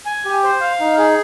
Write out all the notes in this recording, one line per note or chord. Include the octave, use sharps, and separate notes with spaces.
G#5
G4
C5
F5
D#4
G#4